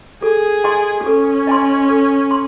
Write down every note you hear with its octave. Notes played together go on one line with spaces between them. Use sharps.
G#4 A4
D#5 G#5 C6
C#4 A4
D#5 G#5 C6
A4
C6